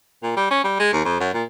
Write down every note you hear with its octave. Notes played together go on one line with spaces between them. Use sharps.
A#2
G3
C#4
G3
G#3
D#2
F2
F#2
A#2